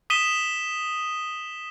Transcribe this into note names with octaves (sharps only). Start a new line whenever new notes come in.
D#6 B6 D#7 E7 G7